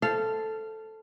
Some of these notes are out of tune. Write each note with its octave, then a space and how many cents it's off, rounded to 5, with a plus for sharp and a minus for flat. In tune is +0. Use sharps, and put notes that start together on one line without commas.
A4 +0 C5 +0 F5 -20